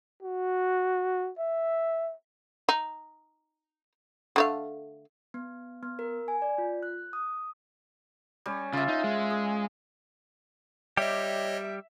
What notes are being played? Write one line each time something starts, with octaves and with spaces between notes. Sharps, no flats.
F#4
E5
D#4
D3 A3 F5
B3
B3
A#4
G#5
D5
F4
F#6
D#6
G3 C#4
C#3 F4 E5
D#4
G#3
G#4
G3 G4 C#5 D#5 E5